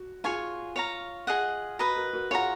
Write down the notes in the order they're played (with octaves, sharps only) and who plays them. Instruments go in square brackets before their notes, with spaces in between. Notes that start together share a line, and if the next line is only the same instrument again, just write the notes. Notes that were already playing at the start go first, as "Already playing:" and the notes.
Already playing: [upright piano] F#4
[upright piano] F4 [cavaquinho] G#4 C#5 G#5 C#6
[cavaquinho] C#5 F5 A#5
G#4 D#5 F#5
[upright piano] F#4 [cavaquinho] B4 D#5 A#5
[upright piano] F#4 A#4
F#4 A#4
[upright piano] F4 G#4 [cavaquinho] C#5 F#5 A#5